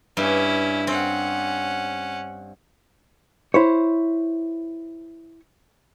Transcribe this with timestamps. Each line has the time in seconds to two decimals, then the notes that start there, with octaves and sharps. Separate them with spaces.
0.17 G2 C#4 E4
0.87 C4 C#4 F#5
3.54 E4 C5 C#5